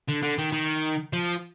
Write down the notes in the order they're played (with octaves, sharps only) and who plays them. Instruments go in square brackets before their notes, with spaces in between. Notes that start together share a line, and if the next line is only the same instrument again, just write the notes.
[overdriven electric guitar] D3
D3
D#3
D#3
F3